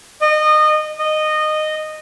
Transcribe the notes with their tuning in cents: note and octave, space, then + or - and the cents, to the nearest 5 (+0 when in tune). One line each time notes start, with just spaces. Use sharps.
D#5 -25
D#5 -15